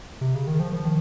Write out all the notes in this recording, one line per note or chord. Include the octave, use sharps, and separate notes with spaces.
C3
C#3
D#3
F3
F3
D#3